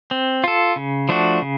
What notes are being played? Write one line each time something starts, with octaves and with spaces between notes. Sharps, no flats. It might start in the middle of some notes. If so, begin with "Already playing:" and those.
C4
F4 A4
C#3
F3 A3 D4 F#4
C#3